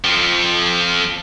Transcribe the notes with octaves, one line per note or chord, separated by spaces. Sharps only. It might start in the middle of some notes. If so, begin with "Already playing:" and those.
F2 F3